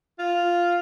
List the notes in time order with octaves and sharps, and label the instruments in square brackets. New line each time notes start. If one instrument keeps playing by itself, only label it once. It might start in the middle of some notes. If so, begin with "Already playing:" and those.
[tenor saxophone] F4